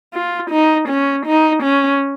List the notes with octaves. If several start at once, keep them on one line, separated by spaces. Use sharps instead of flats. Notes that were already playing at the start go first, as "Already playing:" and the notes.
F4
D#4
C#4
D#4
C#4